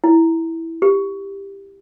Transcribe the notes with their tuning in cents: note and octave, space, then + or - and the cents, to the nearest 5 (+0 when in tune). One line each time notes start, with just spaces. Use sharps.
E4 -5
G4 +10